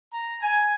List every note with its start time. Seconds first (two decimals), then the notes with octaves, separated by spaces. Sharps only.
0.12 A#5
0.41 G#5